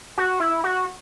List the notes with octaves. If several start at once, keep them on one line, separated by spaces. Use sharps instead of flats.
F#4
E4
F#4